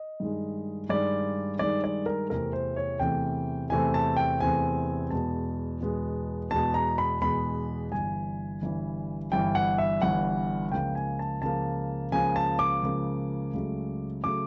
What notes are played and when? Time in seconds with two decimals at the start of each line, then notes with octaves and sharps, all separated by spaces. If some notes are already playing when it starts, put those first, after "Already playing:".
Already playing: D#5
0.20 G2 D#3 G#3
0.89 G2 D#3 G#3 D5
1.59 G2 D#3 G#3 D5
1.84 D5
2.06 A#4
2.30 E2 C3 E3 A3 C4 A#4
2.53 C5
2.76 C#5
3.00 E2 C3 E3 A3 C4 G5
3.70 E2 C3 E3 A3 C4 G#5
3.94 A5
4.16 G5
4.40 E2 C3 E3 A3 C4 G#5
5.11 E2 B2 G#3 B3 A5
5.80 E2 B2 G#3 B3
6.51 E2 B2 G#3 B3 A5
6.74 A#5
6.98 B5
7.21 E2 B2 G#3 B3 B5
7.91 G1 G2 E3 G#5
8.62 G1 G2 E3
9.32 G1 G2 E3 G5
9.55 F#5
9.78 E5
10.02 G1 G2 E3 F#5
10.72 C#2 C#3 F3 A#3 G5
10.95 G#5
11.19 A5
11.42 C#2 C#3 F3 A#3 A5
12.12 C#2 C#3 F3 A#3 G#5
12.36 A5
12.59 D6
12.83 C#2 C#3 F3 A#3
13.53 C#2 C#3 F#3 A3
14.24 C#3 F#3 A3 D6